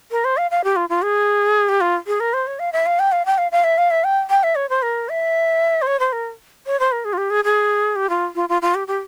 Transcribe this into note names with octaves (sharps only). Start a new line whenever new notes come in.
A#4
C5
F5
F5
G4
F4
F4
G#4
G4
F4
G#4
A#4
C5
C#5
F5
E5
F5
G5
F5
G5
F5
F5
E5
F5
E5
G5
G5
E5
C#5
C5
A#4
E5
C5
C#5
C5
A#4
C#5
C5
A#4
G#4
F4
G4
G#4
G#4
G4
F4
F4
F4
F4
G4
G4